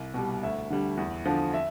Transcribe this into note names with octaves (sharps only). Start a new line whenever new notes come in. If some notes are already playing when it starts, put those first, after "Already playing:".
Already playing: C2
B2 G3
D2 E5
D3 G3
E2
D3 F3
E5